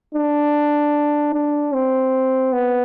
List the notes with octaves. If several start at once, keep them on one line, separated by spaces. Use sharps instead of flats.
D4
D4
C4
B3